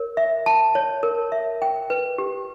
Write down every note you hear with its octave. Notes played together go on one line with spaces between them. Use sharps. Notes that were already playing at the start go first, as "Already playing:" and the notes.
Already playing: A#4 C#5
E5
A5
C#5
A#4
E5
G5
B4
G4